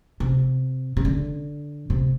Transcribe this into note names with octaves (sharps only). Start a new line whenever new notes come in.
C3
C3
D3
C3